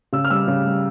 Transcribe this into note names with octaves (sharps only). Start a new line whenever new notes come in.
C#3 E6
F6
G3 E6
C#3
G3